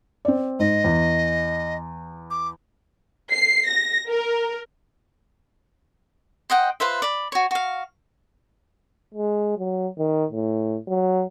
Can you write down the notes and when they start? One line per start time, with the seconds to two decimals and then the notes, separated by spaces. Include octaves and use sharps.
0.25 C4 D5
0.59 G#2 D#5
0.84 E2
2.30 D6
3.31 C7
3.68 A#6
4.09 A#4
6.50 C5 D#5 F#5 G5
6.80 F4 B4 C5 E5
7.02 D5 B5
7.32 F#4 C#5
7.51 F#4 F5
9.14 G#3
9.58 F#3
9.98 D#3
10.32 A2
10.88 F#3